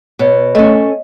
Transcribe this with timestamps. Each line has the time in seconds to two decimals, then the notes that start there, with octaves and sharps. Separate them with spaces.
0.19 B2 C#5
0.55 A3 C#4 D#5